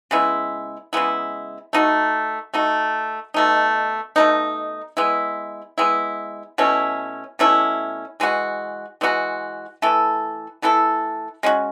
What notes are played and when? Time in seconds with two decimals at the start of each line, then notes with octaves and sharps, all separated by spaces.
0.11 C#3 G#3 B3 E4
0.93 C#3 G#3 B3 E4
1.73 A3 D#4 F#4
2.54 A3 D#4 F#4
3.34 B2 A3 D#4
4.16 B2 A3 D#4
4.97 G#3 B3 E4
5.78 G#3 B3 E4
6.58 B2 A3 C#4 E4
7.39 B2 A3 C#4 E4
8.20 E3 G#3 D#4 F#4
9.01 E3 G#3 D#4 F#4
9.82 E3 A3 E4 A4
10.62 E3 A3 E4 A4
11.43 G#3 C#4 F#4